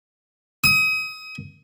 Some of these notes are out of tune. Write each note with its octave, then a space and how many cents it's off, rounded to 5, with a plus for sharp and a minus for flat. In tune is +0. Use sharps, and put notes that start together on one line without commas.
D#6 +30